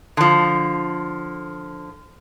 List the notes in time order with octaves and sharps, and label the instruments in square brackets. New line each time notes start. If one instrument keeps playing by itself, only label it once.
[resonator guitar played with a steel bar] D3 F3